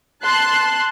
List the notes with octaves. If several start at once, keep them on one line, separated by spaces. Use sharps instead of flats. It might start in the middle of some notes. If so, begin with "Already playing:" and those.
A5 C6 F#6